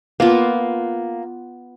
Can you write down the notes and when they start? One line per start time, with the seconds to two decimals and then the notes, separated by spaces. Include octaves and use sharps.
0.20 A#3 B3 F4